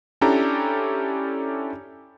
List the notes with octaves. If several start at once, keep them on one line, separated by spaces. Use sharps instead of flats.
C#4 D4 E4 G4 A4 A#5